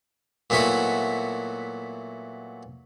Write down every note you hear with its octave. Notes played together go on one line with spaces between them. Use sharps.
A#2 F#3 A3 B3 E4 F#4